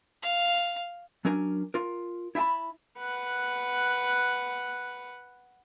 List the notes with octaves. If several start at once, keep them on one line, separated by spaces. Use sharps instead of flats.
F5
F#3 C#4 D4 A#4 G#5
F4 A#4
E4 E5 G5 A5 B5
B4 F#5